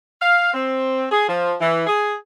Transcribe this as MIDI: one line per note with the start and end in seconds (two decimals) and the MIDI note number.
0.21 0.52 77
0.54 1.06 60
1.12 1.26 68
1.29 1.54 53
1.61 1.84 52
1.87 2.13 68